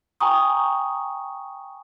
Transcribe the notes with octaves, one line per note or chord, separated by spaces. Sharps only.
G5 G#5 A#5 C#6 D#6